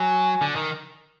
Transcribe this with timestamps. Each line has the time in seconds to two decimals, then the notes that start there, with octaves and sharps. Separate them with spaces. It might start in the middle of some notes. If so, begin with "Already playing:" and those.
Already playing: F#3 G#5
0.41 D3
0.56 D#3